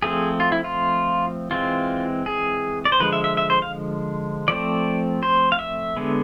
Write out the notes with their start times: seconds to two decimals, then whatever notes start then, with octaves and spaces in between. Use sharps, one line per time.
0.02 F3 A3 C4 G#4
0.40 F4
0.52 E4
0.64 F4
1.51 E3 G#3 C4 F4
2.26 G#4
2.85 D5
2.92 C5
3.00 D3 F3 G#3 B4
3.13 E5
3.24 E5
3.37 E5
3.50 C5
3.62 F5
4.48 F3 A3 C4 D5
5.23 C5
5.52 F5
5.59 E5
5.97 D3 G#3 B3